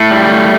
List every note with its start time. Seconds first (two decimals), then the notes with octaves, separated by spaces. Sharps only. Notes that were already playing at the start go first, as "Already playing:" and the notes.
Already playing: A2 A3
0.11 G3
0.31 A2